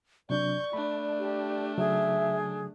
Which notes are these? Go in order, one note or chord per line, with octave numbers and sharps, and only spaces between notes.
C3 F#3 D4 D5 C#6 G6
A3 D4 B5
G4
C#3 F#3 G#4 E5